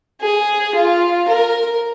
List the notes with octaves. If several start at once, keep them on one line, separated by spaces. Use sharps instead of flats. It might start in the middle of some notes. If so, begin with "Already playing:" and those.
G#4
F4
A#4